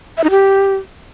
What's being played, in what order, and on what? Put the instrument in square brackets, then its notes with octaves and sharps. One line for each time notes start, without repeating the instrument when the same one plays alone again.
[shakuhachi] E5
D#4
G4